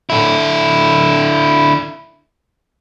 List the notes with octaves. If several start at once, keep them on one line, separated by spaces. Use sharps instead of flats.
D3 E4